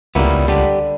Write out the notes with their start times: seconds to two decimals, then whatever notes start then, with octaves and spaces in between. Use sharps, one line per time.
0.15 C#2 G3 A#3 B3 E4
0.48 D3 G3 G4 B4